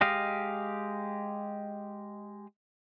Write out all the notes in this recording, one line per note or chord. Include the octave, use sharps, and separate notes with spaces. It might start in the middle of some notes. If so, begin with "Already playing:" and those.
G#3 G4 D#5 F5